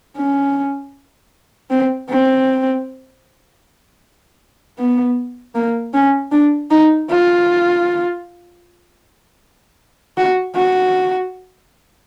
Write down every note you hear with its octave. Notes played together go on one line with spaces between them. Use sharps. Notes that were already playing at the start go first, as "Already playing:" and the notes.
C#4
C4
C4
B3
A#3
C#4
D4
D#4
F4
F#4
F#4